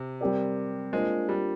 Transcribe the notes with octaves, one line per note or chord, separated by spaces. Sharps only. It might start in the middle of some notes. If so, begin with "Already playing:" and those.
Already playing: C3
G3 C4 G4 A#4 D5
G#3 A#3 D4 F4 C5
G3